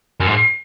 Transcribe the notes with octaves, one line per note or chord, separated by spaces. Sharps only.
F#2
G#2